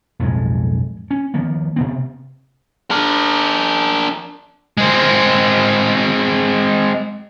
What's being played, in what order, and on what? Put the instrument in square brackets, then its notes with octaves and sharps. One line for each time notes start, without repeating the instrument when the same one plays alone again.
[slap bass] B1 F2 A2 G#3
C#4
D#3 F3 A#3 B3
C3 B3 C4
[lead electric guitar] D4 A#4
[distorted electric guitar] G#3 C4